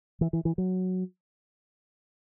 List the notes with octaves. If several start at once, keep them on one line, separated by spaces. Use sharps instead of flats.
E3
E3
E3
F#3